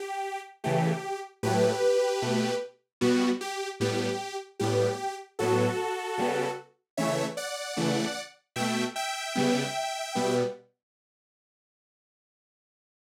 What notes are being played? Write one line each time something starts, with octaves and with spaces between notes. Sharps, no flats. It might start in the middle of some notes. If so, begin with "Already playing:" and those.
Already playing: G4
C#3 E3 A3 G4
A2 F#3 A3 G4 B4
B2 A3
B2 G3 B3 F#4
G4
A2 G3 B3 G4
A2 G3 B3 G4
A2 F#3 B3 F#4 A4
C#3 G3 B3
C#3 E3 A3 C#5 E5
D5 F#5
C#3 E3 A3
B2 A3 E5 G5
E5 G5
C#3 G3 B3
B2 G3 B3